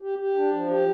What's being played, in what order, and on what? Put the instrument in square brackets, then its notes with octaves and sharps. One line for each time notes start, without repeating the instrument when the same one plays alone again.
[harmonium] G4
G4
D4
F3
G4